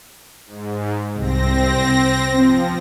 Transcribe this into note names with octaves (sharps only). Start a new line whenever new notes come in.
G#2
C2 C4 A#6
F3 C4